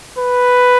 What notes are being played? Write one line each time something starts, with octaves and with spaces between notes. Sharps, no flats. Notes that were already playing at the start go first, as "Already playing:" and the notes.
B4